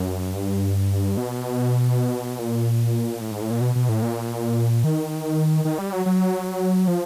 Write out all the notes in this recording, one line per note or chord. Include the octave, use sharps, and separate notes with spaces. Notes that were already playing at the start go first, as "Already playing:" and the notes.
Already playing: F#2
G2
B2
A#2
A2
G#2
A2
A#2
B2
B2
A2
A#2
D#3
D#3
G3
F#3
F#3
F3